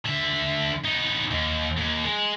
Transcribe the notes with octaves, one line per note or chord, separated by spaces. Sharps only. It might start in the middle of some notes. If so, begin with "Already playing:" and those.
D3 E5
B3 D#4
D#2
D#2
G#3